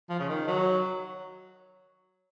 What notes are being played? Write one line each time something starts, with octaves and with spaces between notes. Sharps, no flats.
F3
C#3
D#3
F#3